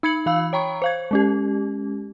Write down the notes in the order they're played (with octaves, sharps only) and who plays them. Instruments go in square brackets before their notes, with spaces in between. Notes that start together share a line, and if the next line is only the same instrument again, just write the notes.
[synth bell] D#4 B5 G#6 C#7 F#7
E3 F5 B5 E6
C#5 G5 A#5 B5 C#6
C5 F5 G#6
G#3 C#4 G4